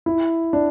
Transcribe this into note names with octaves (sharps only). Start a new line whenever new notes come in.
E4
D4